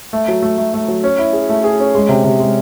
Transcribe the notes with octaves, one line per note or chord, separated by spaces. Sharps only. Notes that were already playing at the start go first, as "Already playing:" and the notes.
A3
F#3
A3
A3
A3
F#3
C#4
E4
G#4
A3
G#4
C#4
G#3
C3
C3
G#3